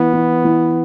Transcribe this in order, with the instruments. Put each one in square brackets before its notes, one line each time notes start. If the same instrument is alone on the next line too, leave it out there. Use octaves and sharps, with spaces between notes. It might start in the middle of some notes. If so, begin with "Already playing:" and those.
Already playing: [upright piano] E3 [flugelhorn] B3
[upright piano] E3
E3